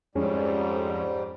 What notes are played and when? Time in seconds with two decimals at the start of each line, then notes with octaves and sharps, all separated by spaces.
0.15 F2 G#2 G3 G#3 C#4